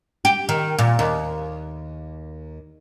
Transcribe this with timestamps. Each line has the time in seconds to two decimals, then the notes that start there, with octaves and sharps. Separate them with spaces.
0.25 G4
0.49 D#3
0.79 A#2
0.99 D#2